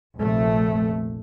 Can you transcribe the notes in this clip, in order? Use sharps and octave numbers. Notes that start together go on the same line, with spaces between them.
F1 A#1 A3